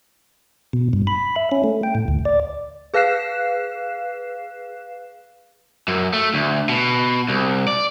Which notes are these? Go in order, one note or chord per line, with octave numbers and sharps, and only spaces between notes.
B2
G2
B5
E5
C#4
A3
G5
A2
D2
D5
G#4 B4 F5 F#6 C7 E7
F#2
A3
D2
B2
C2
D5